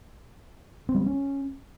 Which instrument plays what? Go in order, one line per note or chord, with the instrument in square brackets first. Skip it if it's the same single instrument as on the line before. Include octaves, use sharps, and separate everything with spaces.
[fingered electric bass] C4
G3
C4
C#4